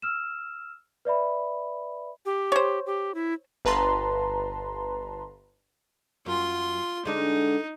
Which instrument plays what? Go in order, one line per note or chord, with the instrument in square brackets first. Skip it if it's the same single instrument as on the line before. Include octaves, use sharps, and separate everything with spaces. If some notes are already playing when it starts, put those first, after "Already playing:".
[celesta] E6 F6 E7
B4 D5 E5 B5
[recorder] G4
[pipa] C5 C#5
[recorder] G4
E4
[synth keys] G1 B4 A5 A#5 C6
[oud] F#2 [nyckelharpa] F4 C6
[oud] D3 G#3 D4 [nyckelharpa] D#4